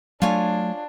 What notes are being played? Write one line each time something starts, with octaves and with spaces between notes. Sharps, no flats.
F#3 A3 D4 F4 C#5 G#5